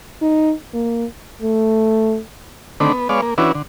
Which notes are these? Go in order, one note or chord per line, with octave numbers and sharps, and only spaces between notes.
D#4
A#3
A3
D3 D#3 A3 C4 D4 B5
B3
G#3 B3 C#5 D5 F5
A#3
E3 C#4 D4 E4 F#4 B4
D3